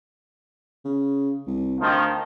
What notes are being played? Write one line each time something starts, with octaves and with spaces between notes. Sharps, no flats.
C#3
C2
D2 D#3 F3